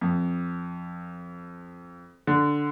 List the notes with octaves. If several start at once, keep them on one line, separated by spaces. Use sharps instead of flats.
F2
D3